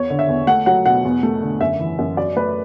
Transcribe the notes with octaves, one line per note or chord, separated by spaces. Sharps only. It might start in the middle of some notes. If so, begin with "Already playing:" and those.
Already playing: E2 C#5
D3
E5
E2
A3 F#5
F#3 F#5
B2 F#5
E2
A3
D3
F#2 E5
E3
F#2
F#3 D5
A3 B4